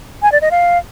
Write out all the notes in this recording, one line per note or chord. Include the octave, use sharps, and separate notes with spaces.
G#5
D5
D#5
F5